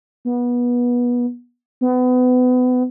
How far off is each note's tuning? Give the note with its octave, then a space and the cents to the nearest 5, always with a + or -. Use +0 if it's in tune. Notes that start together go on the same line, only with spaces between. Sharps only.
B3 -25
B3 +30